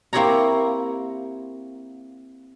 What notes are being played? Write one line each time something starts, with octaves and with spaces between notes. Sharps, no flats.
A#3 C4 E4 G4 C#5 A#5